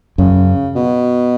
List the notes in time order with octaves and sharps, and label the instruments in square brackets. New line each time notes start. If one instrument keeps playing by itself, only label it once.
[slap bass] F#2 [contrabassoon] C#3
[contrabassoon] B2